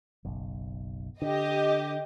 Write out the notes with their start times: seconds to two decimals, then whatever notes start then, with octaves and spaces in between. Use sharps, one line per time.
0.25 F#1 B1
1.22 D3 G4 D#5